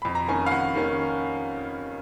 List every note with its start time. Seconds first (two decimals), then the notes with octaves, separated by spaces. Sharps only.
0.02 F2 B5
0.15 A#5
0.28 D#3 A#3 C#4 G#5
0.46 F5
0.51 F2 F#5
0.76 D#3 A#3 C#4